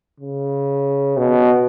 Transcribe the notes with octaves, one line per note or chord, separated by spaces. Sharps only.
C#3
B2